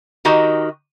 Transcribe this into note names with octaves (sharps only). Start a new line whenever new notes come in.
D#3 D#4 F#4 G4 D#5